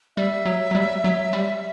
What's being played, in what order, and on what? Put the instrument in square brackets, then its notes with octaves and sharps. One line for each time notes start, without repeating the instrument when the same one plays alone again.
[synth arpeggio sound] G3 [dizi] E5
[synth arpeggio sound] F#3
F#3
G3
F#3
G3